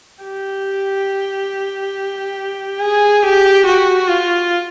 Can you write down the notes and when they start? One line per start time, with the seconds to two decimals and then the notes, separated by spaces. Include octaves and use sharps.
0.24 G4
2.80 G#4
3.23 G4
3.66 F#4
4.08 F4